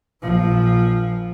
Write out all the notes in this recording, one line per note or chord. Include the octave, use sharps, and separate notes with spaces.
A#1 F3